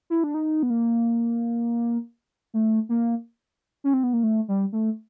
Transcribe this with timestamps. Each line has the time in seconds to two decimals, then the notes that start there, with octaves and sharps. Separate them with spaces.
0.10 E4
0.24 D4
0.34 D#4
0.63 B3
0.70 A#3
2.54 A3
2.89 A#3
3.84 C#4
3.93 C4
4.03 B3
4.13 A#3
4.23 A3
4.48 G3
4.73 A3